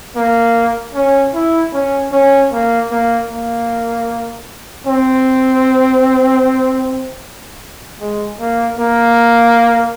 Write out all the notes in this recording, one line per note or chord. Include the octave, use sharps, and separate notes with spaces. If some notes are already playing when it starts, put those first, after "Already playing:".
A#3
C#4
E4
C#4
C#4
A#3
A#3
A#3
C4
G#3
A#3
A#3